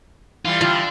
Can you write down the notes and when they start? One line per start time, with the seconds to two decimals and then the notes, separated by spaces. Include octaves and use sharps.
0.45 E3 G3 F4
0.61 D3 D4 F4